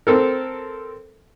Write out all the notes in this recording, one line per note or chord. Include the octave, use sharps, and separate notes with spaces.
C4 A4 A#4